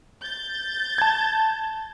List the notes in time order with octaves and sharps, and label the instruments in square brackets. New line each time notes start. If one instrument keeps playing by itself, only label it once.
[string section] G6 A6
[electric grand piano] A5 G#6